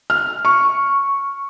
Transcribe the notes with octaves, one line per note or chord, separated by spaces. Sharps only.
F6
C#6